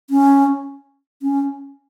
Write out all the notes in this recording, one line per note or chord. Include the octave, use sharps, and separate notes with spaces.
C#4
C#4